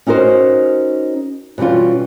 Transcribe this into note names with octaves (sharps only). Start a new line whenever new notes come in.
C#4 D#4 F#4 A#4 C5
B2 E3 G3 C#4 F4